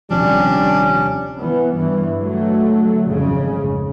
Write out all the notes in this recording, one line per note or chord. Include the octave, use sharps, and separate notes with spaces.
D#1 C3 F3 G3 C#4 D4
E3 B3
G2 E3
D3 F#3 A3
G#1 F2 C#3